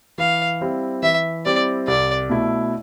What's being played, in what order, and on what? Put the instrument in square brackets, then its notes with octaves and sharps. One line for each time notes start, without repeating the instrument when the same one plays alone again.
[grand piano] E3 [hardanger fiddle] F5
[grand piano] G3 C4 E4
[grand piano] E3 [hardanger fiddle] E5
[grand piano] G3 C4 E4 [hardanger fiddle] D5
[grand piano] C2 [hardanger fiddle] D5
[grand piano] B2 A3 E4